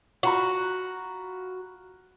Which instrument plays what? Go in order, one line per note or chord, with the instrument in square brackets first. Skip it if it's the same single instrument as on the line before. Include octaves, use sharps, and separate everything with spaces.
[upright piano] F4 A#5 B5 [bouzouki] F#4